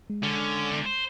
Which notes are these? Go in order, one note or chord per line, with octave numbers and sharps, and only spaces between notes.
G#3
D3 C#4
E2
C5